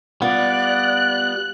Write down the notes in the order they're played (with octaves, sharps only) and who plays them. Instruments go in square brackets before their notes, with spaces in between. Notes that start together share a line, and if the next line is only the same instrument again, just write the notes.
[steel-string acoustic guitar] G3 F4 [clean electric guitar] B3 [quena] D5 [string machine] F#6